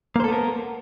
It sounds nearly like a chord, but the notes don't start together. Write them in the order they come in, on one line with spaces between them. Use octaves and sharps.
A#3 C5 A4 B3 A#4